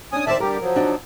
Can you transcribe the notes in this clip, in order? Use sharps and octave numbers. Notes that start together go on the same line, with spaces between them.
C#4 D4 G#5 D#6
D#3 C5 D5 E5 A5
D3 G3 G4 A#4
F3 F#3
D4 D#4 F#4